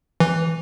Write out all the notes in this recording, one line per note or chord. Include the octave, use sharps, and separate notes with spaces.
E3